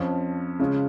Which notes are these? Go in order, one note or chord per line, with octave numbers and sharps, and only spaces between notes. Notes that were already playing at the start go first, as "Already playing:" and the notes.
Already playing: F2 F3 C#4
C#3 G#3 C#4 F4